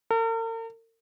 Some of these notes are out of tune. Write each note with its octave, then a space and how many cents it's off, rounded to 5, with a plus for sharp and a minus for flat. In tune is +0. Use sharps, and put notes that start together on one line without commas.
A#4 -45